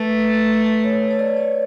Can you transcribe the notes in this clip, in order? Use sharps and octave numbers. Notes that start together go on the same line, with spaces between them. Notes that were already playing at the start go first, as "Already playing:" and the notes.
Already playing: A3 B4
C#5
C#5
D5
C#5